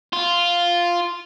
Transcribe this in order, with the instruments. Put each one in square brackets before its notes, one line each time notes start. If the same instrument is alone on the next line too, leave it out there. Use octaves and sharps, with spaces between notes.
[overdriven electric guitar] F4